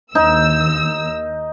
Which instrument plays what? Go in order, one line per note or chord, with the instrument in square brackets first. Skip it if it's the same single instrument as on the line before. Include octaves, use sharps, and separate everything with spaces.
[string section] D#2 E6 [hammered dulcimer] D#4